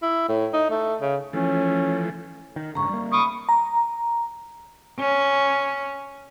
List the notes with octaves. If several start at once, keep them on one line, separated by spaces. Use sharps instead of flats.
E4
A2
D#4
A3
C#3
E3 F3 A3 C#4
D#3
F#1 G#2 D3 A#5 C#6
G3 A#3
B5 C#6 D#6
A#5
C#4